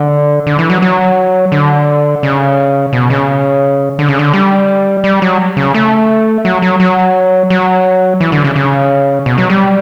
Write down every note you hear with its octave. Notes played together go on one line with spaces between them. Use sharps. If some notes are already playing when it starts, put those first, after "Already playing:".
Already playing: D3
D3
E3
F#3
F#3
D3
C#3
B2
C#3
D3
C#3
D3
G3
G3
F#3
C#3
A3
F#3
F#3
F#3
F#3
E3
D3
C#3
C#3
B2
F#3
G3